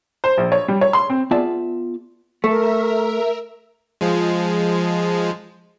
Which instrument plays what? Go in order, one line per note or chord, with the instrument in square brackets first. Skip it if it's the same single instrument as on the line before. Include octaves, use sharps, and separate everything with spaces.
[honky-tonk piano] C5
A#1
C#5
G3
C#5
C6
C4
[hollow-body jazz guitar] B3 F4 G#4 D5 E5 A5
[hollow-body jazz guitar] A3 [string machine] A#4 E5
[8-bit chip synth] F3 G#3